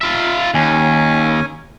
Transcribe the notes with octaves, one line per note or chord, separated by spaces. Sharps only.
F4 E5
D#2 C#4 G#5